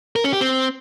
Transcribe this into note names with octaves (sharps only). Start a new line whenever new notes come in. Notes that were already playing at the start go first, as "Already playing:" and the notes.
A#4
C#4
G4
C4